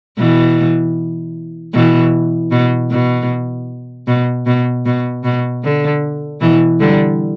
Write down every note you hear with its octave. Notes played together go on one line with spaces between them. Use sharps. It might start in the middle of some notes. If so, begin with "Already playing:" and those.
B2 E3
B2 E3
B2
B2
B2
B2
B2
B2
D3
B2 E3
D3 G3